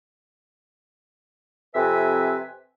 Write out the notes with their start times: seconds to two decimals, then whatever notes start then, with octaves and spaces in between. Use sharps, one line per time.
1.74 F2 C3 B4 E5 G#5